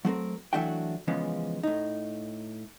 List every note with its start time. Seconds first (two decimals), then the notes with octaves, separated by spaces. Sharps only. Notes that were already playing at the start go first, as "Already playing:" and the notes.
0.05 F#3 A3 C4 A#4
0.53 E3 F#3 A3 D4 F#4 G5
1.08 C#3 E3 F3 G#3 B3 C#4
1.63 A2 D#4